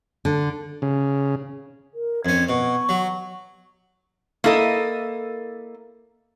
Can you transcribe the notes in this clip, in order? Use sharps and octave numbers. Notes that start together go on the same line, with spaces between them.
D3
C#3
A#4
F2 C#4 G#6
B2 C#6
F#3
A#3 E4 A4 D#5